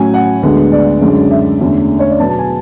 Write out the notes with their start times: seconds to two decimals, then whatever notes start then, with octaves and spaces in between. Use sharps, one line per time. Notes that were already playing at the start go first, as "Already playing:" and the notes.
Already playing: A2 F#3 C#4 G#5
0.14 F#5
0.43 D2 D3 G#3 B3
0.72 D5
1.01 F#2 D3 G#3 C#4
1.31 E5
1.60 E2 D3 A3 C#4
1.99 C#5
2.10 D5
2.19 B2 F#3 B3 A5
2.29 A5
2.38 G#5